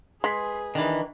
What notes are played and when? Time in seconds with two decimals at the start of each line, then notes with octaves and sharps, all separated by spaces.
0.24 G#3 G#4 B4 C6 B6
0.75 D#3 E3 D4